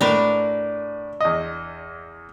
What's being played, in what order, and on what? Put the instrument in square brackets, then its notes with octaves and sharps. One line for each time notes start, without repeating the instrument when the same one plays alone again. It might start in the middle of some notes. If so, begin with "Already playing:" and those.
[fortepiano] A2 B4 [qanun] D4 A#4
[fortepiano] E2 D#5